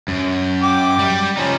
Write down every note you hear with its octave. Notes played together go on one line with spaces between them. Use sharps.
F#2
G5 D6
G3
F3 C#4 D#4